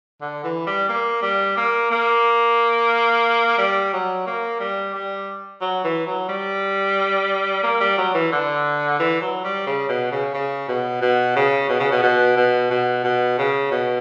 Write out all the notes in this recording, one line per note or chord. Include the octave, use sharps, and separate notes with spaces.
D3
E3
G3
A#3
G3
A#3
A#3
G3
F#3
A#3
G3
G3
F#3
E3
F#3
G3
A#3
G3
F#3
E3
D3
E3
F#3
G3
C#3
B2
C#3
C#3
B2
B2
C#3
B2
C#3
B2
B2
B2
B2
B2
C#3
B2